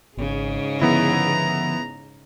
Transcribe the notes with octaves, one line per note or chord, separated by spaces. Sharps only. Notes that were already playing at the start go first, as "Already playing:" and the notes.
G#1 G#2 C#3 G#4
D3 F3 B3 E4 A#5